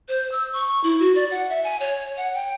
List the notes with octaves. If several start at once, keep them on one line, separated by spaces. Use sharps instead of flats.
C5
E6
C#6
E4
F#4
D5
F#5
E5
G#5
C#5
F#5
G5